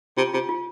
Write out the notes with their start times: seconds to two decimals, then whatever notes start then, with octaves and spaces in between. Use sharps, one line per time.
0.17 C3 F4
0.34 C3 F4
0.49 F4